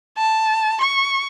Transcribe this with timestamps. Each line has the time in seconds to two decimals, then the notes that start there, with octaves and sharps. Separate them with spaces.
0.17 A5
0.81 C#6